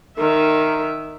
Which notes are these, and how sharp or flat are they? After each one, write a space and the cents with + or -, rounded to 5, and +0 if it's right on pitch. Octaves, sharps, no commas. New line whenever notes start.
D#3 -10 E5 +0